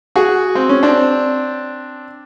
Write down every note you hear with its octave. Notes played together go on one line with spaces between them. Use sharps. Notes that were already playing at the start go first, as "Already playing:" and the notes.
F#4 G#4
C4
C#4
C4 D4